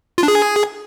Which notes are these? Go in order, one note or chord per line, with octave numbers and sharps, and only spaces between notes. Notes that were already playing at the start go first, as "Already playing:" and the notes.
F4
D4
G#4